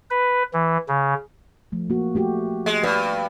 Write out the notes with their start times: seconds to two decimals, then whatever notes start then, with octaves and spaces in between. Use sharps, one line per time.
0.10 B4
0.53 E3
0.88 C#3
1.72 F3 A3
1.90 A#3 F#4
2.15 A3 F#4 G4
2.66 G#3
2.83 G2 B4 D5